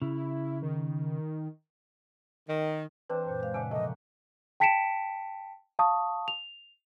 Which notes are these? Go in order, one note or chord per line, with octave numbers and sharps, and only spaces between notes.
C#3 E4
D#3
D#3
E3 C4 D4 B4
F#2 A#2 C5
G#3 F5
A#2 C#3 D4 E5 F#5 G#5
C3 F3 A3 A#3 D#5
G5 A5 B6 C#7 D7 E7
F5 A5 C#6 D#6
F7